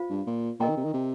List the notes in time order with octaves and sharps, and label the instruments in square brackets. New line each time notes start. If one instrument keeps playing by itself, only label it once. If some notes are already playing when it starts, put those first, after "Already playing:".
Already playing: [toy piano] F4 C5 F5
[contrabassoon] G2
A#2
[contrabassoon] A#2 [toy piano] A#4 D#5 G5 A#5
[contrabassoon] D#3
C3
D#3
C3